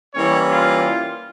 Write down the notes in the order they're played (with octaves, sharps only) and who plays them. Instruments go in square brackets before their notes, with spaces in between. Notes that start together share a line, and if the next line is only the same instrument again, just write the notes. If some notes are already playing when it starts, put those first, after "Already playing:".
[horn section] E3 G3 A#3 C#4 C#5
F4